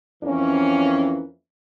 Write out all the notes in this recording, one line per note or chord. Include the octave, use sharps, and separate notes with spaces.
F2 E3 A#3 C#4